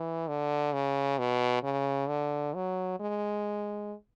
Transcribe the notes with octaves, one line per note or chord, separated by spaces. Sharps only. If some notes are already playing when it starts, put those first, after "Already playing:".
Already playing: E3
D3
C#3
B2
C#3
D3
F#3
G#3